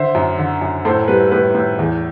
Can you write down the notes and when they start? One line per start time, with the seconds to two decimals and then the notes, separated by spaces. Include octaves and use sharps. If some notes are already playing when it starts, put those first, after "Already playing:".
Already playing: D3 C5 E5
0.15 F#2
0.38 D3
0.62 F#2
0.85 A2 A4 C5
1.08 G3 B4
1.31 A2 B4
1.55 A2
1.79 E2